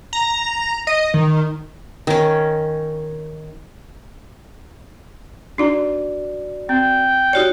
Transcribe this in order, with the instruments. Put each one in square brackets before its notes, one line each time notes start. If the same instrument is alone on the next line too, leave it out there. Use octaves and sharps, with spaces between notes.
[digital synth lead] A#5
D#5
D#3
[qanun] D#3 C#4
[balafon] D4 D#4 A#5 [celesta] F#4 D5
[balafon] C4 [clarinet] G5
[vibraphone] D#4 F#4 C#5 [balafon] G4 D5